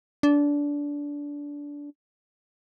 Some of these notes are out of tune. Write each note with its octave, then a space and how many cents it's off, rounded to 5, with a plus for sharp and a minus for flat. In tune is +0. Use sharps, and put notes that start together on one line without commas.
D4 -20